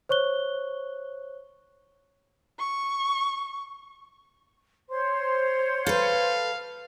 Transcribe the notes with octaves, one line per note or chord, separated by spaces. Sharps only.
C5 C#5 C#6 F#6 G7
C#6
C5 C#5 C6
A4 B4 F5